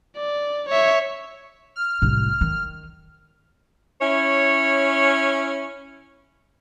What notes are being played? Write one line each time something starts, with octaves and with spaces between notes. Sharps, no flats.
D5
C#5 E5
F6
C2 A2
D#3
C#4 E4 C#5